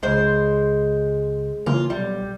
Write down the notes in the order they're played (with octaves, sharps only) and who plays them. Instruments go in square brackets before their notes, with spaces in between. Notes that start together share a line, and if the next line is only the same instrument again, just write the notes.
[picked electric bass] C#2 [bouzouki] G#3 C5
[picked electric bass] C#3 E3 A#3 [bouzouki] F4
[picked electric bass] B1 [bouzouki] G3